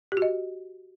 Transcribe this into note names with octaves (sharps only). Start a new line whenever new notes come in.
G4
F#4
D#5